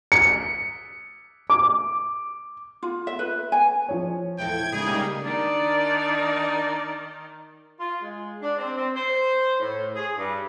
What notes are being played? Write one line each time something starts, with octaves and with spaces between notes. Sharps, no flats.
C#7
D6
F4
E5
B4
G#5
F3 C#5
E2 E4 A4 G5 G#6
C#3 G3 G#3 A#3 D#4 G#4
D#3 D4 D#4 D5
F4
G#3
D4
C4
C4
C5
A2
G#4
G2